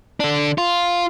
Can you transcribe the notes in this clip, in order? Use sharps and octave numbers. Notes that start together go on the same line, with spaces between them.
D3 D4
F4